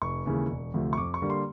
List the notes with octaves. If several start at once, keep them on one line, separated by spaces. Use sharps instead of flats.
F1 C#6
D#2 C#3 E3 G#3
E1
D2 C3 F3 A3
C#6
F2 D6
C#6
D3 G3 A#3
C6